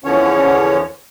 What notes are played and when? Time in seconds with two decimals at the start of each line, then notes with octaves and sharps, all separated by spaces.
0.04 E2 D3 E3 F3 C#4 C#5